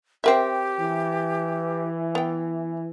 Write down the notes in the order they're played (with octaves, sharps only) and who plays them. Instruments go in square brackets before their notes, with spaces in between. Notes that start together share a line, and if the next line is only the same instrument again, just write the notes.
[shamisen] C4 A#4 E5 [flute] G4
[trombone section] E3
[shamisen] B3 G5